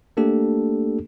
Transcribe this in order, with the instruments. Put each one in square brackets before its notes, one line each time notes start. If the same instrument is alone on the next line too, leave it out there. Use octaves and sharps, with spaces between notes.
[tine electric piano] A3 A#3 D4 G4 A4